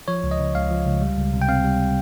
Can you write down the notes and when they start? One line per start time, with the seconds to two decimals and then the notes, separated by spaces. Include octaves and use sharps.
0.08 F3 C#5
0.24 C#2
0.31 D#5
0.39 C#3
0.55 C#2 F5
0.71 F3
0.86 C#2
1.02 G3
1.18 C#2
1.33 C3
1.42 G5
1.48 C4 F5
1.64 G3